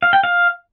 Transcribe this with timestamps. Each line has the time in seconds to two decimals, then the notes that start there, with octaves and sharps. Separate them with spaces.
0.03 F5
0.13 G5
0.24 F5